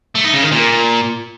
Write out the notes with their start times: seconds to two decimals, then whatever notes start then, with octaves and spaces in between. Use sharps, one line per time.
0.15 A3
0.24 D#4
0.33 C#3
0.43 D#3
0.52 A#2